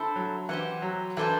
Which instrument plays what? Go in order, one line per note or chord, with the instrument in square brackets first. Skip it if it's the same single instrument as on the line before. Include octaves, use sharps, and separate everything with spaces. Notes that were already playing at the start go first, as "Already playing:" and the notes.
Already playing: [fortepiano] D3 [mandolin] E4 A4 C5
[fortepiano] F#3
[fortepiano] E3 [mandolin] G4 C5 F#5
[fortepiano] F#3
[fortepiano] E3 [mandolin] D4 A4 C5 G5